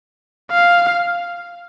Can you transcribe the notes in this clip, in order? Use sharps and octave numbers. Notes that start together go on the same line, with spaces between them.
F5